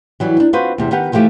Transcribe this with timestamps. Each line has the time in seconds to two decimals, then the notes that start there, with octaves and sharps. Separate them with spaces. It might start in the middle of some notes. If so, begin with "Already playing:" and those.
0.20 E3 F#3 G3
0.37 D4 D#4
0.53 C4 F4 F#4 B4 C5
0.78 E2 C3
0.91 D#3 B3 G4 F#5
1.12 C3 E3 F3 A3 G4